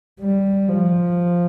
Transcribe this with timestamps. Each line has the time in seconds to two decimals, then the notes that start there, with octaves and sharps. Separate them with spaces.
0.21 G3
0.69 F3